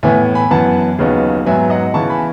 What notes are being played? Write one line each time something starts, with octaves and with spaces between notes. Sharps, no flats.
A2 E3 B3 E5 G#5
G#5 B5
F#2 E3 B3 F#5 A5
D#2 C#3 F#3 B3 D#4
G#2 F#3 B3 E5 G#5
D#5 F#5
C#3 E3 B3 E4 A5 C#6
G#5 B5